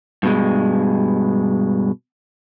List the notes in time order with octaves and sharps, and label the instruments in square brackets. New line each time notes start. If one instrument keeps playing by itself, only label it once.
[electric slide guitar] G2 B2 G#3